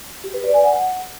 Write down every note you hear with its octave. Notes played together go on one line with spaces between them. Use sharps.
G4
B4
D5
G#5
F#5